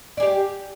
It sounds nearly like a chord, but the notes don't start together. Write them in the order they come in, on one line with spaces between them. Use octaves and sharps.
D5 G#4 G4